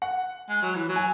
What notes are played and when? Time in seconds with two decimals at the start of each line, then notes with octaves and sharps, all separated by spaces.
0.02 F#5
0.49 G#3
0.62 F#3
0.75 E3
0.89 F#3
0.96 G#5